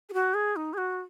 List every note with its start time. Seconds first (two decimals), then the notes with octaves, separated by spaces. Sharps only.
0.09 G#4
0.13 F#4
0.34 G#4
0.56 D#4
0.73 G#4
0.77 F#4